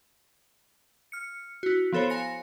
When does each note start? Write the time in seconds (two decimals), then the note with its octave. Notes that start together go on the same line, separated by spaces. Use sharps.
1.12 F6 C#7
1.63 E4 F#4
1.92 F3 B3 A4 C5 C#5
2.10 F5 G#5 A#6 C#7